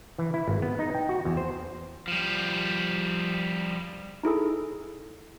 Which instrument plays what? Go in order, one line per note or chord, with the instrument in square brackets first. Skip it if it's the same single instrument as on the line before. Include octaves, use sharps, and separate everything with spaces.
[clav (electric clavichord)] E3
E4
G#1
B3
D#4
G5
F#4
E2
C5
[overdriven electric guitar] F3 G3
[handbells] D#4 E4 G#4 A4